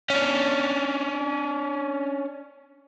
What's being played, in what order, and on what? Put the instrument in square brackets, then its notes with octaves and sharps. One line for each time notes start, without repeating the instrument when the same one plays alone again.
[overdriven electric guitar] C#4 D4